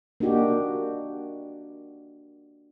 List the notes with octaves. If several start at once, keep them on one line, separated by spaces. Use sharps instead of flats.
A#3 D4 D#4 F#4 G4